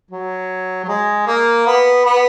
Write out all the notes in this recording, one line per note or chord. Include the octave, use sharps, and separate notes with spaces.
F#3
F#3
G#3
A#3
B3
B3